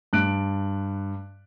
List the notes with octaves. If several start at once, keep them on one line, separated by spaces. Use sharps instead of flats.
G2 F#6 D7